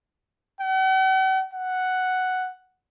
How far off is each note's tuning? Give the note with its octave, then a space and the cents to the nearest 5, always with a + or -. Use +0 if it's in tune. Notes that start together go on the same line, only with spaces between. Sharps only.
F#5 +45
F#5 +0